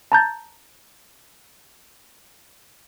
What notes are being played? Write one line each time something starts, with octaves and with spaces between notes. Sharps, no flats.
A5 A#5 G6 A6